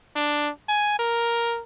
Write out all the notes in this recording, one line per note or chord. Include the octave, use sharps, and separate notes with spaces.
D4
G#5
A#4